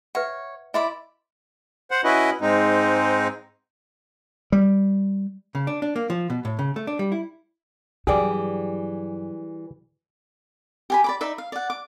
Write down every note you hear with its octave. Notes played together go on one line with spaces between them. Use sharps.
B4 C#5 E5 F#5
E4 D5 D#5 B5 C6
C5 F#5
C#4 E4 F#4 B4 D#5
G#2 G#3 C4 D#4
G3
C#3
D4
D4
A#3
F3
B2
A2
C#3
A3
D4
G3
E4
G2 E3 F#3 G3 G4 G#4 D5
G4 G#5 B5
D5 B5 D6
D#4 D5 E5 B5
F5
D5 F#5
D6